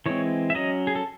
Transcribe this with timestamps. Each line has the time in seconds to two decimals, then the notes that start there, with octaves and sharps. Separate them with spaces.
0.06 E3 G#3 C4 C#5
0.50 E5
0.55 F#3 C#4 D#5
0.87 G#4
0.95 A4